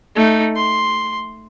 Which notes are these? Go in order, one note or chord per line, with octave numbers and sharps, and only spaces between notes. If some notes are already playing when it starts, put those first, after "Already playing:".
A3 D#4
C6